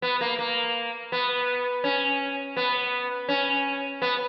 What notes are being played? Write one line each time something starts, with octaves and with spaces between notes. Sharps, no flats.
B3
A#3
A#3
B3
C#4
B3
C#4
B3